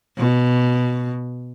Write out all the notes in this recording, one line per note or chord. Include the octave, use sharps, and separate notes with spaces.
B2